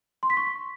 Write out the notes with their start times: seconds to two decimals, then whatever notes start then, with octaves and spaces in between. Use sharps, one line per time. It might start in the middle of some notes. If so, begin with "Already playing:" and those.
0.23 C6
0.30 B6
0.37 C#6